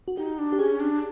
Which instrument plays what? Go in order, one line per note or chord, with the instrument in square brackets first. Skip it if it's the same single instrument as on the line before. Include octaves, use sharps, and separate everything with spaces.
[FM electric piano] F#4
[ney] D#4 [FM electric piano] G4
[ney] D4
[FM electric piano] G4
[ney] C#4 [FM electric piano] G#4
[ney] D4